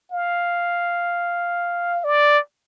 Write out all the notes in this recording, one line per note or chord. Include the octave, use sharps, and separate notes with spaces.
F5
D5